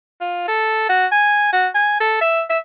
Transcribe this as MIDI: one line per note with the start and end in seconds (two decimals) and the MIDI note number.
0.20 0.45 65
0.48 0.85 69
0.89 1.06 66
1.11 1.51 80
1.53 1.68 66
1.75 1.98 80
2.00 2.21 69
2.21 2.43 76
2.50 2.59 76